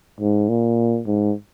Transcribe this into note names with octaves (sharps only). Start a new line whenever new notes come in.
G#2
A#2
G#2